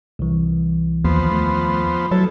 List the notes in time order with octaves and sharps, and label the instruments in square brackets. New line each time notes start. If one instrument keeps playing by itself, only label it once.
[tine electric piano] C2 E3
[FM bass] D#2 [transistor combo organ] F3 B3 C5
[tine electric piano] A3
[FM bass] F#3 [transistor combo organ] E4 A4 [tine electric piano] B4